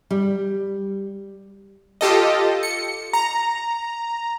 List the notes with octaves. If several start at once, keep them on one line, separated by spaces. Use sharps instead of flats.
G3
F4 G4 A4 D#5
C#7
A#5